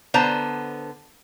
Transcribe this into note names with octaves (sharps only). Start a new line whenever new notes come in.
D3 B3 C5 A5 A#5